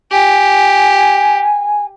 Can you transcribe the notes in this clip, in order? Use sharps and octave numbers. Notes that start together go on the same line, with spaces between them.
G4 G#5